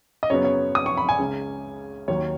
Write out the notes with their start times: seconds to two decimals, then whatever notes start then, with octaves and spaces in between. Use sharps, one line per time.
0.23 D#5
0.30 F#2 C#3 F#3 B3 C#5
0.45 C#5
0.75 D#6
0.86 C#6
0.97 B5
1.09 G#5
1.19 C#2 C#3 G#3 C#4
2.08 D#2 D#3 F#3 C#5